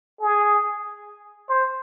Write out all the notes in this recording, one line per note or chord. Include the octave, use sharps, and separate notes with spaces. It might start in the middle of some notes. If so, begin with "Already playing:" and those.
G#4
C5